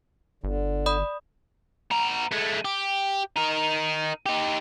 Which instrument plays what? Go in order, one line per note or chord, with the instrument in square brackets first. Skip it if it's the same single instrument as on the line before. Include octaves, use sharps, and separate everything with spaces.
[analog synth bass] G1 [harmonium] D3
[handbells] D5 B5 D#6
[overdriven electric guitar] B3 A#5
G#3 A3
G4
D#4 A#4
D#4 G4